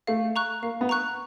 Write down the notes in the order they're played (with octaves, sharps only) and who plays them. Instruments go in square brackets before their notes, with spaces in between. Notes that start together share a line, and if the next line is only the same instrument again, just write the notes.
[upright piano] A3 [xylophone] F5
[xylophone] A#5 C#6 F#6
[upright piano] A#3 [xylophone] F5
[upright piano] B3
[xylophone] A#5 C#6 F#6